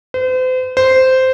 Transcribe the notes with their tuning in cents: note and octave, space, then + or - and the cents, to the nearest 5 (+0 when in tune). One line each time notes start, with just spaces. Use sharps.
C5 -40
C5 -10